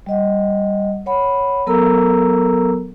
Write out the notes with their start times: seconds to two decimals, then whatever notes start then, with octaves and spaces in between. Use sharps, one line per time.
0.06 G3 D#5 F#5
1.06 C#5 F#5 B5
1.67 F#3 B3 A4 A#4 A#5 E6